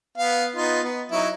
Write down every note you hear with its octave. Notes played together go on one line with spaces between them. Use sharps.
B3 F5
B3 D#4 F4
B3
F#3 D#4 E4